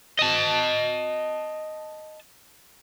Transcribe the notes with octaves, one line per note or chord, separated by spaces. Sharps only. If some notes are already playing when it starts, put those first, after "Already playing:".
D#5 A5